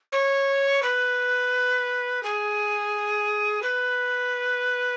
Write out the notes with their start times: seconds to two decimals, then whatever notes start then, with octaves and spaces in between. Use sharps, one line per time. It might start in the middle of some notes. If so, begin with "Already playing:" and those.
0.12 C#5
0.82 B4
2.23 G#4
3.62 B4